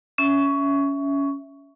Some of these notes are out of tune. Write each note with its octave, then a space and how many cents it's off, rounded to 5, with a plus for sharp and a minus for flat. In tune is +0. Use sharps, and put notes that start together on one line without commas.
C#4 +15 E5 +0 C#6 +15